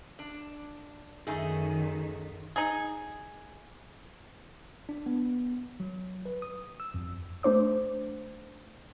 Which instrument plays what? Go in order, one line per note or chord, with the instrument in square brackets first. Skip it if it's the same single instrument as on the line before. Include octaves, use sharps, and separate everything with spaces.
[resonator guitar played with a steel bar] D4
[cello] F#2 D#3 [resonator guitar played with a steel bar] A3 D#4 G#4
[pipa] D#4 G#4
[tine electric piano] D4
B3
F#3
B4
D#6
E6
F2
[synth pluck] A3 D4 C5 D6